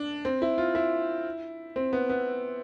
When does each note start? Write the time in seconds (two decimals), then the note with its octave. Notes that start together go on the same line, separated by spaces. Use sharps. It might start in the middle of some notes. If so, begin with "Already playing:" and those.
Already playing: D4
0.25 C4
0.42 E4
0.58 F4
0.75 E4
1.76 C4
1.93 B3
2.09 B3